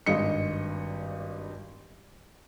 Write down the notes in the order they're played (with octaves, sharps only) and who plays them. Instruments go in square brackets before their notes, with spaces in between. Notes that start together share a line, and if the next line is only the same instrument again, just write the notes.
[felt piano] G#1 G2 G3 D#5 C#7